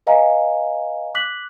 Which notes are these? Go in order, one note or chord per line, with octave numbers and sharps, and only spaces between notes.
B4 D#5 F5 G#5 A#5
D6 F#6 B6 F#7